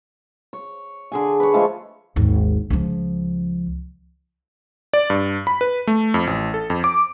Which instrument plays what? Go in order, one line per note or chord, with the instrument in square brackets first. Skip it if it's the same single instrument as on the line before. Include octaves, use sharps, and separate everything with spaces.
[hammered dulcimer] C#5
D3 G#4 G#5
B4 C#5
F3 G#3 A3 F5
[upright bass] G#1 D#2
C#2 F3
[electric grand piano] D5
G2
B5
B4
A3
F2
A1
A4
F2
D6